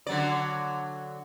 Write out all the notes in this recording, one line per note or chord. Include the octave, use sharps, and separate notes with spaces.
D3 F#3 D5